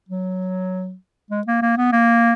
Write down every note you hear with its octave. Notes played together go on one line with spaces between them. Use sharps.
F#3
G#3
A#3
A#3
B3
A#3